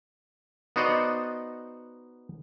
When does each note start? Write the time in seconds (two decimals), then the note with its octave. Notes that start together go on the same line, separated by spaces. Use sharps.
0.76 B3 D#4 F#4 C5 D5 D#5